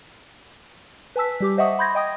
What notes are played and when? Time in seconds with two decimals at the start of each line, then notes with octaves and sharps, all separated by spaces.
1.16 B4 G#5 A5 E6 B6
1.40 G3 G4 D6
1.57 C5 D#5 E5 F#5 C#6 D#6
1.79 B5 C6 G6 G#6 A#6
1.95 D#5 G5 D#6